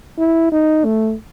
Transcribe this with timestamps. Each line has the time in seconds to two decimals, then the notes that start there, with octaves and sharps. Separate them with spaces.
0.18 E4
0.52 D#4
0.84 A3